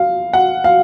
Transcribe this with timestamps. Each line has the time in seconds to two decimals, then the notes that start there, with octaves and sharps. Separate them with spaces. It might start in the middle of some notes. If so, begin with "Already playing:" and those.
Already playing: F5
0.33 F#5
0.64 F5